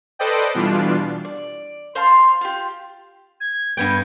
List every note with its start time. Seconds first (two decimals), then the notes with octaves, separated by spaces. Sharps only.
0.19 A4 B4 C5 D5 D#5 G5
0.55 B2 E3 G3 D4 F4
1.25 D5
1.95 C5 F5 A5 C6
2.41 F4 G4
3.40 G#6
3.77 G2 B3 G5